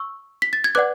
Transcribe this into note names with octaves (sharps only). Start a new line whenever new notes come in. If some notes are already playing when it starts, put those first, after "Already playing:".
Already playing: C#6 E6
B6
A6
G#6
B4 D5 F#5 D6 F#6